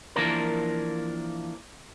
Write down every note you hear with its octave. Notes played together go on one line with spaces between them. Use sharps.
E3 F3 A#3 D4 A#4